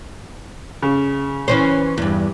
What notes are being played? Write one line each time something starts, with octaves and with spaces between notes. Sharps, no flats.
C#3
E3 C#4 C5
E2 G2